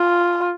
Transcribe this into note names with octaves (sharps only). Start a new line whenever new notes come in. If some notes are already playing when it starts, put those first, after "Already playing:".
Already playing: F4